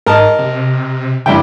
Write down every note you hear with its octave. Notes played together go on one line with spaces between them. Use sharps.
G#2 A#4 D#5 A5
C3
G2 C#3 E4 G5